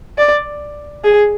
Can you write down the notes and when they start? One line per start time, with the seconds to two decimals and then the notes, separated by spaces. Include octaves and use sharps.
0.18 D5
1.04 G#4